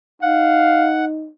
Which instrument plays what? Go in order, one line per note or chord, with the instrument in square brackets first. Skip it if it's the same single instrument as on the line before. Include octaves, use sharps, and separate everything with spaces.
[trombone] D#4 [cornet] F5 [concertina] F#5